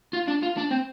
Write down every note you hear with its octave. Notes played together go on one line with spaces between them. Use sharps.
F4
D4
F4
D4
C4